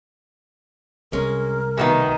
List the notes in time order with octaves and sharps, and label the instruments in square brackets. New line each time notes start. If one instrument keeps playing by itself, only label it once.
[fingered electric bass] C2 [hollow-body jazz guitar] G#3 C#4 [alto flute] A#4
[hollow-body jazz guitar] D2 B2 B3 [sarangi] D#3